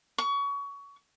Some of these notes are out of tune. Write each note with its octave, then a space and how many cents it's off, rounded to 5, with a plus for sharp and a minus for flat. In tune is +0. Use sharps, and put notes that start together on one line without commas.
C#6 +25